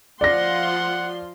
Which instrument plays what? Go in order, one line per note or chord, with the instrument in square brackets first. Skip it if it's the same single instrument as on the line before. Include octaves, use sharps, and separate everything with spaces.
[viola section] F3 F4 C6 [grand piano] D5 A#6 [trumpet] F#5